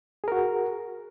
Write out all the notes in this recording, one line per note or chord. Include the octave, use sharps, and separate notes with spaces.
F#4 G#4 A#4